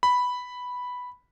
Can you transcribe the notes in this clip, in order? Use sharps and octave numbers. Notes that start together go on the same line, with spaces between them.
B5